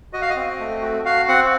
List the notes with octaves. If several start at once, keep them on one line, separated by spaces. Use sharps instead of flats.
F#4 D#5
F5
D#5
C4
A3
F#4
F#4 F5
C4 F#5